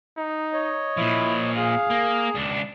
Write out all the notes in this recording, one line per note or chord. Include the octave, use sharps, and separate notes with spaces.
D#4
C#5 D#5
A#2 F3 E4
G#4 F5
A#3
C#2 D4